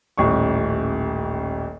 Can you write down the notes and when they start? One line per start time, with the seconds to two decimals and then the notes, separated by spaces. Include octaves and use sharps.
0.17 D#1 A1 C#6